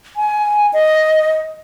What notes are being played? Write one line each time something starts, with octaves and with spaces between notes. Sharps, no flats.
G#5
D#5